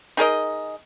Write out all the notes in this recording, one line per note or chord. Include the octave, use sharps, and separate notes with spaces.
D#4 G#4 A#4 D#5